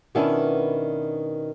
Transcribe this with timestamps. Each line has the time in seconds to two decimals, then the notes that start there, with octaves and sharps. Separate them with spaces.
0.15 B2 D#3 B3 C#4 D4 E4